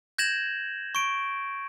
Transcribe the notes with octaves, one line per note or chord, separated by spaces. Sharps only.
G6 G#6 A#6 E7 F#7
C#6 D7